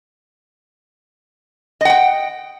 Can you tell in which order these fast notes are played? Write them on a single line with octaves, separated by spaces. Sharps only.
D#5 F#5 G5